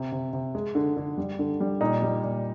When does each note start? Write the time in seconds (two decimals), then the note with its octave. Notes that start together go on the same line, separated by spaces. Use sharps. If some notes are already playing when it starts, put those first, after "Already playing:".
Already playing: C3
0.12 C3
0.33 C3
0.55 G#3
0.75 D3
0.97 D3
1.17 G3
1.39 D3
1.60 G3
1.81 A#2 D#4
2.02 G3
2.23 A#2